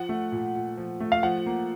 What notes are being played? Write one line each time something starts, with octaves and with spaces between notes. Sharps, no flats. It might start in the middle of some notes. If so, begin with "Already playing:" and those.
Already playing: F3 F#5
A3
A#2
A#2
F3
A3
F5
F3 F#5
A#3